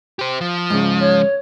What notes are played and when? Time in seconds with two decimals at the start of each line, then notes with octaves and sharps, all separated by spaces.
0.19 G4 C5
0.41 F3
0.70 G#2 C#3
1.00 C#5